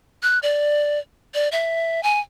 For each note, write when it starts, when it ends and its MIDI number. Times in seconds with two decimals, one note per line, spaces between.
0.23 0.39 90
0.43 0.99 74
1.34 1.49 74
1.52 2.03 76
2.03 2.20 80